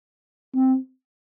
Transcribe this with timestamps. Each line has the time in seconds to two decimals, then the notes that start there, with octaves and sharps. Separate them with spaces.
0.55 C4